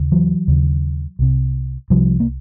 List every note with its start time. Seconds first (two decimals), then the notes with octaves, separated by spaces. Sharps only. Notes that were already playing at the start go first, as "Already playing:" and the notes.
Already playing: D#2 C#3
0.12 E3 F#3
0.48 D#2 C#3
1.19 C2 C3
1.90 C2 C3 F3 G3
2.20 A#3